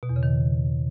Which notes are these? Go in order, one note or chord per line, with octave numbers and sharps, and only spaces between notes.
B2
E2
C#3
D#3